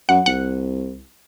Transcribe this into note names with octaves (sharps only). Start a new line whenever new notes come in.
F#2 F#5
C2 F#5